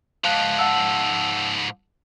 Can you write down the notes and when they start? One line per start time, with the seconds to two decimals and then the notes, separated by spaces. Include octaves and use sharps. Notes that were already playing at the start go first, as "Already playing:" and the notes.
0.24 G#2 F3 F5 A5 F#6
0.59 F#5 A5 E6